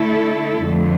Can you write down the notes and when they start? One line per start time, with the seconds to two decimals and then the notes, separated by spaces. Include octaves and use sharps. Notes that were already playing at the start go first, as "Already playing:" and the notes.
Already playing: D3 A3 E4 A4
0.64 F2 D3 A3